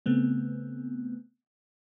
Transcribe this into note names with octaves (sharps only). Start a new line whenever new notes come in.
C#3 A3 B3 C4